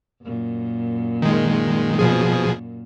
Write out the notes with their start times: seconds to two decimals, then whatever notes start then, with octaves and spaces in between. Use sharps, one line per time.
0.23 F#2 A#2
1.22 D#3 G#3
1.99 B2 F3 G#4